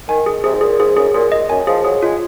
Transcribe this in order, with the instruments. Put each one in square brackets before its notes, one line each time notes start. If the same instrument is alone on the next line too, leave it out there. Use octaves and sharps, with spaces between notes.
[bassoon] D#3 [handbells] G#5
[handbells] G#4
[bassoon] C3 [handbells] G#4
[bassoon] G#2
[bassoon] A#2 [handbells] G#4
[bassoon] G#2 [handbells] G#4
[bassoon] F#2 [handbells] G#4
[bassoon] A#2 [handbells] G#4
[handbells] D#5
[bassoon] F#2 [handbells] G#5
[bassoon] F3 [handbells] G#4
[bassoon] F#3 [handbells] G#4
[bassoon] G#3 [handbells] F4